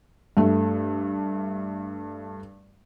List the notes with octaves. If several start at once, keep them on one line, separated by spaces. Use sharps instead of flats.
G2 A3